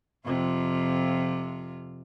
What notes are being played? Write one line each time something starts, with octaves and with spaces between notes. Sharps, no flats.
F2 C3 F4